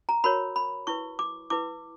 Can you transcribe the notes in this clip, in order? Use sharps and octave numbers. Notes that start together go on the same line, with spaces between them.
A#5
F#4 A#4 C#5 B5
B5
E4 B4 C#6
D6
E4 B4 D6